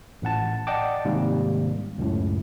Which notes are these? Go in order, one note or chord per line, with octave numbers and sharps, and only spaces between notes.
A1 A2 F#5 A5
D5 D#5 F#5 G5 A5 D6
G#2 C3 D#3 G3 A#3
C#2 F#2 A2